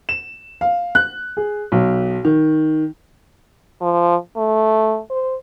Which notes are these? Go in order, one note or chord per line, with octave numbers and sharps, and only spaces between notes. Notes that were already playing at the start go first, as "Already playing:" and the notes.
E7
F5
F#6
G#4
B1
D#3
F3
A3
C5